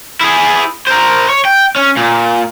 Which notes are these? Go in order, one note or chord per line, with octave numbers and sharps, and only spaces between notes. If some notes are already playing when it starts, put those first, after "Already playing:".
E4 G#4
A#4 C5
C#5
G5
C#4
A#2